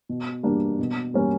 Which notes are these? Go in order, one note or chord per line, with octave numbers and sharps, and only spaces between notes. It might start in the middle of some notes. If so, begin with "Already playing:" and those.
B2
G3 A#3 D4
B2
G3 A#3 C#4